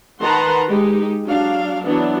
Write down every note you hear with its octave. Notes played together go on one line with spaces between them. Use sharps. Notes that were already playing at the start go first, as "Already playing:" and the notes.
D#3 B4 F#5 A5 A#5 C6
G#3 D#4 G4
F#3 D4 F5
E3 F#3 B3 D4